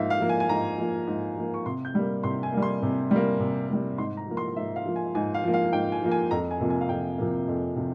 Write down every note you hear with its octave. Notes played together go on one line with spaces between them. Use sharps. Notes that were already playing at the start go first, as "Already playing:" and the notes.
Already playing: G#2 F3 A#3 E5 F5
F5
F3 A#3
G#5
G#5
G#2 A#5
F3 A#3
G#2
F3 A#3
C#6
C3 C6
G6
G3 A#3
C3 C6
G#5
G3 A#3
C6
C3
G3 A#3
C3
G3 A#3
G#2 C6
A#5
F3 A#3
C6
G#2 E5
F5
F3 A#3
G#5
G#2 G#5
F5
F3 A#3
F5
G#2 G5
G#5
F3 A#3
G#5
F2 A#5
G#5
C3 F3 A#3
G#5
F5
F2 G5
C3 F3 A#3
F2
C3 F3